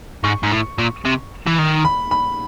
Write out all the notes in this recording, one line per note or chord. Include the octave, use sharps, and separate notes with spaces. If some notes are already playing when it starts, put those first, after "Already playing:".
G#2 C#6
G#2
A2
A#2
C3
E3
D#3
B5
B5